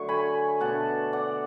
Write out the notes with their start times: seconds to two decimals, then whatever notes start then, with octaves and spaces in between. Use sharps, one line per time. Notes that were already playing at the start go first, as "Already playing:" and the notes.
Already playing: D3 F#3 A3 C#6
0.09 G#5 B5
0.60 B2 A3 D4 F#5 A5
1.13 D5 F#5